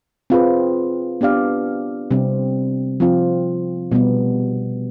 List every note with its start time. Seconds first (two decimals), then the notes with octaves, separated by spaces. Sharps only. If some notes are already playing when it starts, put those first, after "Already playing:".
0.30 C4 F4 G#4 B4
1.21 B3 D4 G4 D5 F5
2.11 C3 G3 C4
3.00 F3 C4 F4
3.91 B2 G3 B3